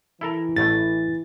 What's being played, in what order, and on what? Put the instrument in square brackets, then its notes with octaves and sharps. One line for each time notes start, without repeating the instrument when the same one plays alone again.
[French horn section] E3 [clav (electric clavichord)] E4 A4 A#4
[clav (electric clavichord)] A1 A2 A3 [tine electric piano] A6